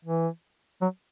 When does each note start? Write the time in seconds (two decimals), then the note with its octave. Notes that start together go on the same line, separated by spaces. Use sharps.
0.05 E3
0.81 F#3